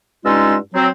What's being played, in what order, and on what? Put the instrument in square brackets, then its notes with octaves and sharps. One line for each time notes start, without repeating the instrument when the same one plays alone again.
[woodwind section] G2 G#3 C#4 D#4 F4 E6
F#3 C4